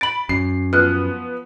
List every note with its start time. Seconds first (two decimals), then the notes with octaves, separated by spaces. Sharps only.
0.01 B5 A6 D7 F#7
0.29 F#2 C7
0.73 F3 B3 F6 F#6